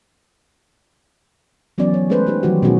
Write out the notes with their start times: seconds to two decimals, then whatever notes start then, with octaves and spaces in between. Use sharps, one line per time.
1.78 E3 F#3 B3 C#4 D5
1.94 C#5
2.09 F#3 G#3 A3 C#4 B4 C5
2.27 D#4 G4 C5
2.43 D#3 E3 F#3 G3 F#4 G4
2.62 B2 G#3 C#4 D#4 F#4 G#4